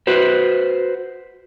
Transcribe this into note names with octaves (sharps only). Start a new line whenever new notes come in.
F#4 B4 C5